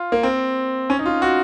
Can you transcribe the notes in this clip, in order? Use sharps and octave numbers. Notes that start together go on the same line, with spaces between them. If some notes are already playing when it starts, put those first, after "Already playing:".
Already playing: F4
A#3
C4
C#4
D#4
F4
F#4